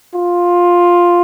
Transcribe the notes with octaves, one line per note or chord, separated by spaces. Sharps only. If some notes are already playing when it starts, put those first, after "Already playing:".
F4